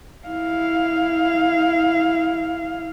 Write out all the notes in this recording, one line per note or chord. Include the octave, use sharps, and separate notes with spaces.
E4 F5